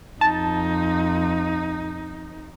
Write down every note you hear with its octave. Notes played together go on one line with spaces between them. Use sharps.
F2 D#4 A5